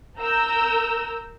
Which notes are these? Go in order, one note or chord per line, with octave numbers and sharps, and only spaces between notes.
A#4 A#5 E6 G6